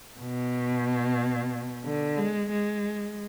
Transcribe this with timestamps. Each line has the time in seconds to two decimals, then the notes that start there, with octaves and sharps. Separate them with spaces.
0.20 B2
1.85 D3
2.17 G#3
2.51 G#3